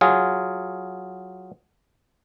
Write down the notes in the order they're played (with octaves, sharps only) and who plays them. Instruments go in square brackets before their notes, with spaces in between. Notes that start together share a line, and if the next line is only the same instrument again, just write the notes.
[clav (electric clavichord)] F#3 F4 G#4